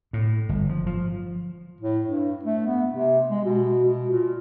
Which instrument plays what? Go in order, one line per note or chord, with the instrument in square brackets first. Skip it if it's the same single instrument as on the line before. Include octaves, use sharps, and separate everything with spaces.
[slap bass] A2
G1
F3
F3
[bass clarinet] A2
G2
A3
B3
C3
G#3
B2
B2
A#2